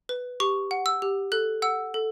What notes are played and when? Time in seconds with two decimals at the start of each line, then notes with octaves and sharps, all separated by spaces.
0.09 B4
0.40 G4 C#6
0.71 F#5
0.86 E6
1.02 G4
1.32 A4 F#6
1.62 F#5 E6
1.94 A4